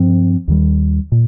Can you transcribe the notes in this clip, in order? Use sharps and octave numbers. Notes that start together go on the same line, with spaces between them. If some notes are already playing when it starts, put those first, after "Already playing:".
Already playing: G2 F3 C4
D#2 D#3 G3
A#2